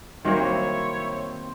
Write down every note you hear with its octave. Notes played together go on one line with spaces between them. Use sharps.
D#3 F#3 G3 A#3 C4 E4 C5 C#5